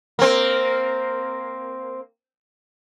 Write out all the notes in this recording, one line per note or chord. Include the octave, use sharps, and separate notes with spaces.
A#3 C4